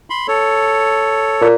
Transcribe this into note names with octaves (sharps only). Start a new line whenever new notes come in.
B5 C6
A4 C#5
A#2